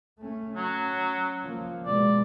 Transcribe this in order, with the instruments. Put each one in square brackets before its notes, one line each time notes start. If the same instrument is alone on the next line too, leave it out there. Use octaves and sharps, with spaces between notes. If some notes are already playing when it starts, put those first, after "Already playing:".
[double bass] A3 C#4
[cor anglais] F#3 [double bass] C#4
[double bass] F3 A#3
[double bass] B2 G#3 [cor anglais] D5